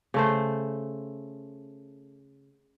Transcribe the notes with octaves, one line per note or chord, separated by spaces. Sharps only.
C#3 A3 C5